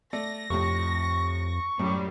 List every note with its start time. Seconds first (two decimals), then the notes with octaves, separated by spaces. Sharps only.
0.13 A3 D5 A#6
0.50 F2 A2 C3 C#6
1.79 F#2 A2 G3